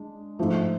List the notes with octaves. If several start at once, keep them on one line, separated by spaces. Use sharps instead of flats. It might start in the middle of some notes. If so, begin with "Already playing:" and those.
Already playing: G#3 D4
G#2 F3 A3